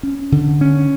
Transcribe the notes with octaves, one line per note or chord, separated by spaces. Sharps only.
C#4
D3
C#4